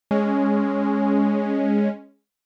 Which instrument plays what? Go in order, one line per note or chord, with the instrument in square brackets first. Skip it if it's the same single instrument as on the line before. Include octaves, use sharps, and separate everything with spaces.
[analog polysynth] G#3 C#4